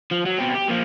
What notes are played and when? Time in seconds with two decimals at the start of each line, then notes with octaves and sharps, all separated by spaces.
0.11 F3
0.26 F#3
0.38 B2 C4
0.54 G4
0.68 A#2 F3